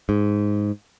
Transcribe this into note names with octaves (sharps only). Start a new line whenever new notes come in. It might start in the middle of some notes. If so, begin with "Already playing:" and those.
G#2